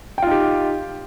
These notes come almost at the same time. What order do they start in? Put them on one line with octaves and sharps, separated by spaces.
G5 F4 D#4 G4